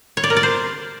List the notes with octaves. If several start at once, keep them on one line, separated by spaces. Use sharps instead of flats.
C#5
D5
A#4
D5
C5